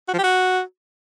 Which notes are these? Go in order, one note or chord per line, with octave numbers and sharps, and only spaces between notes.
F#4
F3
G4
F#4